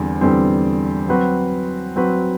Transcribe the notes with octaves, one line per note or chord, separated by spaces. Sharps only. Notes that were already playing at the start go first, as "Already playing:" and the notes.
Already playing: E2 D3 G3 C4
E2 D3 G3 C4
F#3 C4 F#4 B4
F#3 C4 F#4 B4